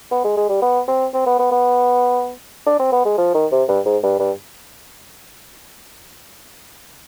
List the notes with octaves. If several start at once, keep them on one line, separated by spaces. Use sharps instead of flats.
B3
G#3
G#3
G3
B3
C4
C4
B3
B3
B3
D4
C4
B3
G#3
F3
D#3
C3
G2
G#2
G2
G2